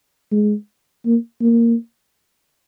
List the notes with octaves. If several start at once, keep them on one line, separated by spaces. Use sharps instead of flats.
G#3
A#3
A#3